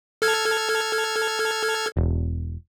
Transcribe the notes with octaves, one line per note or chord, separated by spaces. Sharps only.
A4 F6 G#6
E1